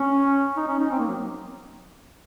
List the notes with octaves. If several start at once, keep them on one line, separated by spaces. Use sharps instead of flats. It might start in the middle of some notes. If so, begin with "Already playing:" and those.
Already playing: C#4
D#4
C#4
D#4
C4
A#3
F#3